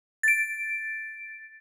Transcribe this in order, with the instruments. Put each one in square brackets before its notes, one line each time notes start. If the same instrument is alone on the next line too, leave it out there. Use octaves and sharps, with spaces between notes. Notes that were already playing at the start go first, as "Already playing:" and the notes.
[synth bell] A6 D7